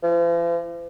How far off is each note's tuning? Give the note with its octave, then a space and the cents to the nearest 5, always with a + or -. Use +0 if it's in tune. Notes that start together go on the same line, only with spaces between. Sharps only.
F3 -45